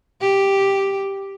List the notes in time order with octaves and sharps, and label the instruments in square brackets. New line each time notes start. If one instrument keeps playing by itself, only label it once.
[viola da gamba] G4